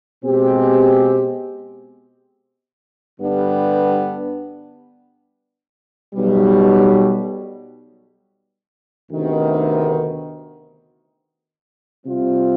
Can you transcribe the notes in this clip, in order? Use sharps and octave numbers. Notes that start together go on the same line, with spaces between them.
B2 G#3 C4 G4
G2 D3 G3 B3 D4
B1 B2 G3
D2 C3 D#3 B3
C3 G3 C4 F4